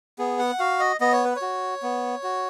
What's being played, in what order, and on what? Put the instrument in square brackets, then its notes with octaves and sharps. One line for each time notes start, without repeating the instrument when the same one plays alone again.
[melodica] B3 G#4
F#5
F#4 F5
D#5
B3 D#5
C#5
B4
C#5
F#4
B3
F#4